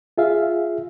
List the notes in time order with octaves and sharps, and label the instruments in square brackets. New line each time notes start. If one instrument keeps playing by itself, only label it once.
[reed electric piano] F4 G#4 E5 F5